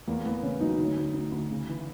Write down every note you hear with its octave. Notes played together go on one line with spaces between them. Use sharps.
E2 A#3
E2 B3
C#3 C#4
F#3 D#4
D2
D2
D2
D2
C#3
E3